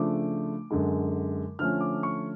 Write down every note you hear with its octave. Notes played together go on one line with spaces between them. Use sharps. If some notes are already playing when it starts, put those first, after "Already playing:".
Already playing: C#3 F3 A3 D4 D6
F#2 D3 G#3
D3 F3 A3 C#4 F6
D6
C#6